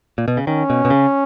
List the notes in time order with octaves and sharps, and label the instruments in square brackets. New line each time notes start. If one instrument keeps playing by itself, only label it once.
[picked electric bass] A#2
B2
C#3
[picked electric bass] D#3 [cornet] C#4
[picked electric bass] B2
B2
C#3